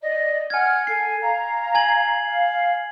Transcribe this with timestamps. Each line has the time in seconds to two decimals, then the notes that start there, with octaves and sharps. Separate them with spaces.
0.02 D5 D#5
0.50 F#5 G#5 F6 G#6
0.87 A4 G#5 C7
1.21 F5 A#5
1.75 G#5 G#6 F#7
2.26 F5